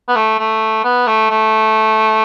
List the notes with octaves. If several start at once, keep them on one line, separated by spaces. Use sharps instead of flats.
B3
A3
A3
B3
A3
A3